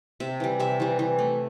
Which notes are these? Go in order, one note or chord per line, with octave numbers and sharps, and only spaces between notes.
C3 E5
E3 G3
C3 E5
E3 G3
E3
A3